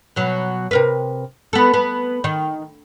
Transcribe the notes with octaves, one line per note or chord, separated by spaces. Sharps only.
B2 F#3
C3 A#4 B4
B3 A4
B3
D#3